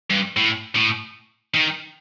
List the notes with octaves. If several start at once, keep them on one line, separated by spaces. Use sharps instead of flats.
G2
A2
A2
D#3